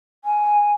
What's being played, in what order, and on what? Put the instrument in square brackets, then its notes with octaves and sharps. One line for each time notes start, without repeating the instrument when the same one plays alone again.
[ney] G#5